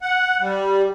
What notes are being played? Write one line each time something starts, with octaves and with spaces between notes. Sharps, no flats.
F#5
G3